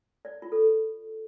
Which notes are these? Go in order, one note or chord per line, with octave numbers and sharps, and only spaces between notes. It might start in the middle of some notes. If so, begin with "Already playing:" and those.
D5
F4
A4